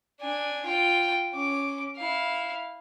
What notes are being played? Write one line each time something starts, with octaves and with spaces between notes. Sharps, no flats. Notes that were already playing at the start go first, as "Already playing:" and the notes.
D4 G#5
F4 G5
C#4 D6
E4 F5